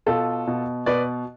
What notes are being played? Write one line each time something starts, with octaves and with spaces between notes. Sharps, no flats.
B2 F4 A4
B2
B2 B4 D5